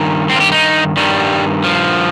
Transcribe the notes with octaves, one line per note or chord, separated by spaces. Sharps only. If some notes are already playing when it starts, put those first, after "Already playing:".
Already playing: G2 D#3
C4
F4
G4
D#4
G2 D#3 G3
F3